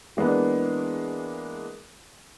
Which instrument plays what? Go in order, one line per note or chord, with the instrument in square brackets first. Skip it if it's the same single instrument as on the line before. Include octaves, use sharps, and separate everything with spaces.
[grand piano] E3 G#3 A#3 B3 D4